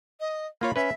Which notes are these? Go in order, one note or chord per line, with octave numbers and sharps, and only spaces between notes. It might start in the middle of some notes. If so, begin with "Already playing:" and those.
D#5
A#3 F4 C#5 B5
C#4 B4 E5